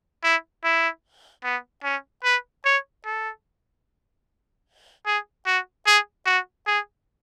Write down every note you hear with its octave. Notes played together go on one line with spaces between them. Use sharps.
E4
E4
B3
C#4
B4
C#5
A4
G#4
F#4
G#4
F#4
G#4